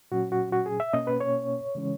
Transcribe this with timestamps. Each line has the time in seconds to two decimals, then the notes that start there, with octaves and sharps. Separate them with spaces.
0.11 A#2 F#3 C#4 F#4
0.32 F#4
0.52 F#4
0.66 G#4
0.80 E5
0.93 B2 A#3 C#4 D#5
1.07 B4
1.20 C#5
1.75 C#3 E3 G#3 C#4